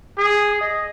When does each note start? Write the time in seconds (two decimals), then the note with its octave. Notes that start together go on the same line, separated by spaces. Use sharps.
0.18 G#4
0.61 D#5